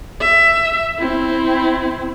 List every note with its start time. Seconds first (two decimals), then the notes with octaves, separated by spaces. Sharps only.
0.21 E5
0.99 C4 E4